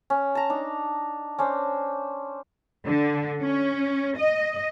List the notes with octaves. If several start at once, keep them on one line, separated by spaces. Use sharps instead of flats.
C#4
A5 A#5
D4 D#4
C#4 D4 C5
D3
C#4
D#5